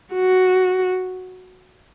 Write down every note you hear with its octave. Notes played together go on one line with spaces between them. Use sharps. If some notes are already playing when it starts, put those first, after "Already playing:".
F#4